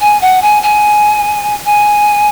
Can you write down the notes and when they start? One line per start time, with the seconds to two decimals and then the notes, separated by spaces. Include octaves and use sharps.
0.01 G#5
0.21 F#5
0.42 G#5
0.63 G#5
1.66 G#5